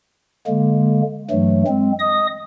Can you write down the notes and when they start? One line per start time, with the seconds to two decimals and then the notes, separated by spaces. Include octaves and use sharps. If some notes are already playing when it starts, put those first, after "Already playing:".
0.47 D3 G#3 A#3
1.31 G2 E3 F#3 A3
1.67 G#3 C4
1.99 D#5 D#6